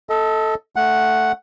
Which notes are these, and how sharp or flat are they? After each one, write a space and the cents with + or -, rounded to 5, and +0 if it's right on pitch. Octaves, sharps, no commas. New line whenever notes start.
A4 +0 D#5 +35
A3 +0 F#5 +0